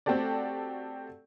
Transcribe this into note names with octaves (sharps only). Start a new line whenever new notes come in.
A3 C4 F#4 G4 A4 D5